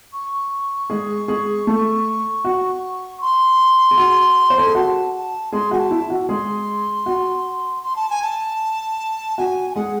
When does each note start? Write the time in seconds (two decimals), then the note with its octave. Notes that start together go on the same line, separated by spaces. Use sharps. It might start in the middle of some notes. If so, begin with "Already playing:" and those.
0.13 C#6
0.90 G#3 G#4
1.28 G#3 G#4
1.67 A3 A4
2.45 F#4
3.21 C6
3.91 G#4
3.98 F#4
4.50 C5
4.58 A4
4.67 G#4
4.75 F#4 A5
5.14 A5
5.52 G#3 G#4 C6
5.71 F#4 G#5
5.78 A5
5.91 E4
6.10 F#4
6.29 G#3 G#4 C6
7.06 F#4
7.83 C6
7.96 A5
8.10 G#5
8.22 A5
9.38 F#4 G#5
9.70 G#5
9.75 G#3 G#4 F#5